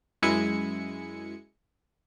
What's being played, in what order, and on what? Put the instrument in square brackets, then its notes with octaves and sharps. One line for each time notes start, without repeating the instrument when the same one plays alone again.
[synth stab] F#2 G#3 E4 G#5 C#7